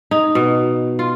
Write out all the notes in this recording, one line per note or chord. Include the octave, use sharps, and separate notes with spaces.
D#4
B2
F4